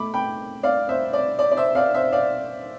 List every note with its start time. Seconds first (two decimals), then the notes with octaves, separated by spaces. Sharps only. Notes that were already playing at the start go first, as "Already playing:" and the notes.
Already playing: B2 A3 B5 D6
0.14 G5 B5
0.63 D5 F5
0.89 C5 E5
1.13 D5
1.39 D5
1.52 D5
1.57 C5 E5
1.75 D5 F5
1.95 C5 E5
2.12 D5 F5